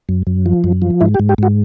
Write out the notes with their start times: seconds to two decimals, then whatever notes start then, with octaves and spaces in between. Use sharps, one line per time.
0.09 F#2
0.27 F#2
0.46 F3
0.64 F#2
0.82 F3
1.01 G#2 E4
1.14 G4
1.20 G#2
1.29 G4
1.38 G#2 F#4